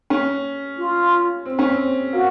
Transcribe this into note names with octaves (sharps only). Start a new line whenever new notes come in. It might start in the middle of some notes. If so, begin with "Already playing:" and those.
C#4
F4
C4
C#4
C4
A#3 F#4